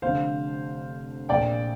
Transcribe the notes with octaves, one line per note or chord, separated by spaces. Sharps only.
F1 F2 D3 C5 F5
A#1 A#2 D5 G5